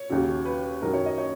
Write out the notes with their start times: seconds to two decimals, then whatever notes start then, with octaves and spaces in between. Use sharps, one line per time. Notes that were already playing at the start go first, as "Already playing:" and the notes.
Already playing: C#5
0.09 D#2 C#3 F#3
0.45 B4
0.82 F#2 D#3 F#3 A#4
0.94 C#5
1.06 D#5
1.18 C#5